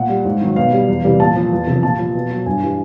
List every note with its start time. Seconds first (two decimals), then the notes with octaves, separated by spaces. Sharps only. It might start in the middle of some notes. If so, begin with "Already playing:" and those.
Already playing: A#2 F#5
0.09 G3
0.25 G#2
0.41 D#3 F#3
0.56 B2 F5
0.72 G3
0.88 E2
1.04 C3 E3 G3
1.20 A#2 A5
1.35 F3
1.51 E2
1.67 C3 F3
1.83 A#2 A5
1.99 F3
2.14 B2
2.31 F#3
2.46 G2 G#5
2.62 E3 G3